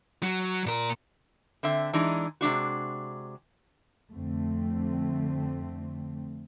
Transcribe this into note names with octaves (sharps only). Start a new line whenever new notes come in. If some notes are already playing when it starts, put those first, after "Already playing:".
F#3
A#2 A#4
D3 C4 E5
E3 G#3 D4 D#4
C3 G#3 D4 F#4
F2 D3 A3 C4